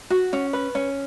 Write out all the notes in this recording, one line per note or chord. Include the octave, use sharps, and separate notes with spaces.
F#4
C#4
B4
C#4